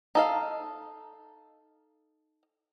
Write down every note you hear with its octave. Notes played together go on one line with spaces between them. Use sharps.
D#4 A4 F5